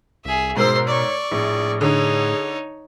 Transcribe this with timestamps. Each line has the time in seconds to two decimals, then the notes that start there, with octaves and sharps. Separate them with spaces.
0.25 C2 G#4 E5
0.57 G#2 B2 G#4 A#4 C5 C6 E6
0.88 C#5 D5 C#6
1.32 A#1 A2 G#4
1.81 D3 D#4 G#4 C#5